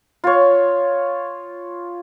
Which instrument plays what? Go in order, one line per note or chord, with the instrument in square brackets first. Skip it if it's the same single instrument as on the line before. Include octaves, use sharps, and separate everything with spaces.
[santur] F4 C#5